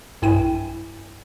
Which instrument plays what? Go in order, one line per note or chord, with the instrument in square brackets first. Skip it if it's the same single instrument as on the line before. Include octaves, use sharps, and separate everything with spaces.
[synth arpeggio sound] B1 G2 E4 G5 G#5 D#7